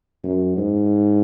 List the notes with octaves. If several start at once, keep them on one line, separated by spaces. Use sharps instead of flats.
F#2
G#2